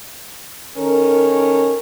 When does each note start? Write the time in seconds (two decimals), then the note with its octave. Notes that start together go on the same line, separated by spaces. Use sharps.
0.77 D#3 C#4 A4 A#4